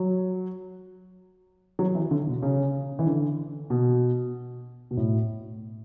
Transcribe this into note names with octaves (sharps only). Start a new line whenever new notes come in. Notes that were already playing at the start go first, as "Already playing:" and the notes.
Already playing: F#3
F#3
E3
D3
B2
C#3
E3
D3
B2
B2
A2